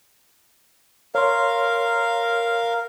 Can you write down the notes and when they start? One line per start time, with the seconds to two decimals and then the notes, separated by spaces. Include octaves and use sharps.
1.15 A#4 C#5 F5 C6